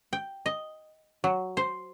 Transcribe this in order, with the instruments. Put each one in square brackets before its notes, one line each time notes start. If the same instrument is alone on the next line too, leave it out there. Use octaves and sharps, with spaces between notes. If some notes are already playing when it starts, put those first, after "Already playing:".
[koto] G5
D#5
F#3
C5